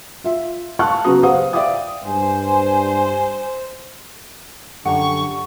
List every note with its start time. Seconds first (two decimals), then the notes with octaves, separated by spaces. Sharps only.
0.24 F4 E5
0.79 F5 A5 C#6 F6 F#6
1.04 C#3 F#3 B3 F#4 A#5 D#6
1.23 G4 B4 C5 F5 F#5 D#6
1.53 D5 E5 F5 G5 D6 D#6
2.05 G2 C5 G#5
4.85 F#2 D3 F3 G4 F#5 A#5 C#6